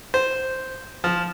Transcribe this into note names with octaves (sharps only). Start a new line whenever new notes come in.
C5
F3